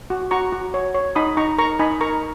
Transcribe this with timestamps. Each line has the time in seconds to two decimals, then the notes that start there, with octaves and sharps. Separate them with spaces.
0.10 F#4
0.31 F#4 A#5 C#6
0.52 F#4
0.74 C#5
0.95 C#5
1.15 D#4 B5 D#6
1.37 D#4 A#5 C#6
1.58 A#4 A#5 C#6
1.79 D#4 G#5 B5
2.01 A#4 A#5 C#6